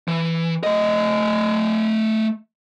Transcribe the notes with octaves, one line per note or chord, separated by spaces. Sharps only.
E3
A3 D#5